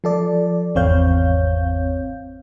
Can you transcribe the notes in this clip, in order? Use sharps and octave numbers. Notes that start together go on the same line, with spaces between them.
F3 A4 D5
G#1 E2 C4 C#5 F5 G6